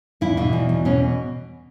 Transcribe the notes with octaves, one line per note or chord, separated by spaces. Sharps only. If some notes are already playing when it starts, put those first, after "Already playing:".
E2 E4
B2 E4
E2
E2
B2 C#4